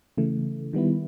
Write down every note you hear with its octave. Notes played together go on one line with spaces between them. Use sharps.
C#3 E3 A3
D#3 G3 B3 E4